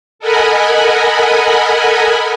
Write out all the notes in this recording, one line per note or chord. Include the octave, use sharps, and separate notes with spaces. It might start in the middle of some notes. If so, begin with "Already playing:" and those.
A4 A#4 D#5 F#5 G#5 B5